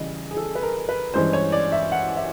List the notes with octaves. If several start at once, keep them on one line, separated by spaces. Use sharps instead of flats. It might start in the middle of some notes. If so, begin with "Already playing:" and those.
Already playing: C#3 E3 G3 D#5
G#4
A4
B4
A#4
B4
G2 E3 G#3 C#4 C5
C#5
D5
E5
F#5
E5